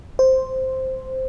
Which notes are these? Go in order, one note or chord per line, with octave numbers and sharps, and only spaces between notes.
C5